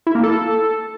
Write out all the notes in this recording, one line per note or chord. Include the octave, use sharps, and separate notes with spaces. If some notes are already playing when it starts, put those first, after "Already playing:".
E4
A#3
A4